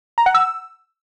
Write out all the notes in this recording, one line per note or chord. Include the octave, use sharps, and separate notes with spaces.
A#5
F#5
E6